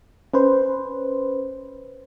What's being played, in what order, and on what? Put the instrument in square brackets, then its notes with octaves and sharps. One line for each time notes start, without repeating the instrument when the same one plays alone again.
[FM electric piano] C#4 B4 C5